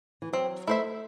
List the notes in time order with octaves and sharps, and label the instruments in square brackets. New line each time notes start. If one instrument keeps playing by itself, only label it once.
[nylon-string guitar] E3
[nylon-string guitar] F#3 [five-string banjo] C4
[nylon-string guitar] A3 [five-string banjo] E4 C5 E5